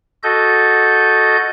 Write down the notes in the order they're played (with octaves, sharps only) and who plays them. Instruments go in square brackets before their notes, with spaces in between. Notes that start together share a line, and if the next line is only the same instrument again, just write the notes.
[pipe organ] F#4 A4 D#5 G6